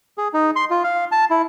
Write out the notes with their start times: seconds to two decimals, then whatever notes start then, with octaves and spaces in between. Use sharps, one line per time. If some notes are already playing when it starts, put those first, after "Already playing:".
0.18 G#4
0.34 D#4
0.56 C6
0.70 F4
0.84 F5
1.12 A5
1.30 E4